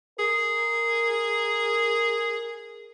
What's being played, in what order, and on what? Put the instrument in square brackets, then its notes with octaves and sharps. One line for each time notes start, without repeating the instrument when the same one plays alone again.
[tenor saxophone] G#4 [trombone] A#4